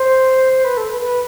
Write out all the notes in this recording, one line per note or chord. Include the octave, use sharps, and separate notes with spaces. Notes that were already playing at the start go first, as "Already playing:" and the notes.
Already playing: C5
B4
A4
B4
B4